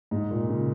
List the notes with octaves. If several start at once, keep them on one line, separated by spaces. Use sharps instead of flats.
G#2
A#2
C#3